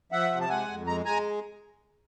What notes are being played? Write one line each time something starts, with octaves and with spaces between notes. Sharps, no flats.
F3 E5 F#5
C3
A5
G#3 F#5 G#5
F2
G#3 A#5
G#3 G#5 A#5